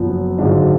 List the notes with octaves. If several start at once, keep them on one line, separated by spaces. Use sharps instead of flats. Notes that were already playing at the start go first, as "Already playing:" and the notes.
Already playing: F#1 F#2 F3 B3
G#1 F#2 D3 G#3 D4